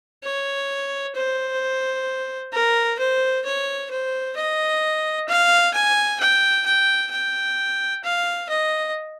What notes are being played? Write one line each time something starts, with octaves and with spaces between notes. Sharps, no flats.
C#5
C5
A#4
C5
C#5
C5
D#5
F5
G#5
G5
G5
G5
F5
D#5